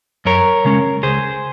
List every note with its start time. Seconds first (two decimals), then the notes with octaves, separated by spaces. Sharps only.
0.25 F#2 A#4 C#5
0.65 C#3 G#3 C#4
1.03 C#2 G#4 C5